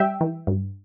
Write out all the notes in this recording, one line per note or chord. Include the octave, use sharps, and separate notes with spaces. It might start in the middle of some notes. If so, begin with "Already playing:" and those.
Already playing: G3 E5 G5
E3
G2